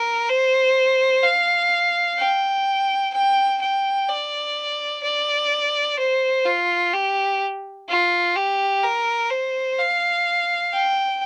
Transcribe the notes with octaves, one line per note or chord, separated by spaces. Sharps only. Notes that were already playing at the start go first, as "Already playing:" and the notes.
Already playing: A#4
C5
F5
G5
G5
G5
D5
D5
C5
F4
G4
F4
G4
A#4
C5
F5
G5